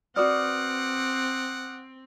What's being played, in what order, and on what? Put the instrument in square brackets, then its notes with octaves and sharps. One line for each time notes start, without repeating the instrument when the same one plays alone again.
[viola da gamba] C4 [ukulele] F#4 B4 D5 [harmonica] F#5 [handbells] D6 D#6 F6